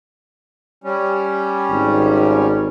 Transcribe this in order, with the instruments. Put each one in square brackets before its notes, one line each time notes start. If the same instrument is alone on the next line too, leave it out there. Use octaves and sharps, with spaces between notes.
[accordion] G3 C#4
[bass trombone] G#1